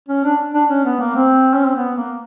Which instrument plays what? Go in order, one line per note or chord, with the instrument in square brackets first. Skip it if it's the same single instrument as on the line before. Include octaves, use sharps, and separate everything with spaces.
[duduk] C#4
D4
D4
C#4
B3
A#3
C4
C#4
C4
B3
A#3